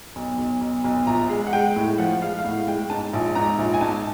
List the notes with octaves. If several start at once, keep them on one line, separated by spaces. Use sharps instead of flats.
B1
B1
B1
B1
A#1 A#5
G#3
F#5
G#3 G5
A2
F3 F#5
G#3 F5
F5
A2 F#5
G#3 G5
G#2 A5
A#1
G#2 A#5
A#1
G#5
G#2 A5